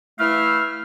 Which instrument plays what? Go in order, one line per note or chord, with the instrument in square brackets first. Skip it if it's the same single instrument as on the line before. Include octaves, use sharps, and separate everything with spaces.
[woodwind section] E3 A3 E4 E5 F5 F6